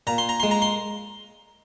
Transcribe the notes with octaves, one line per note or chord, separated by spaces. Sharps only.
A#2 A#5
C6
A#5
G#3 C6
A#5
C6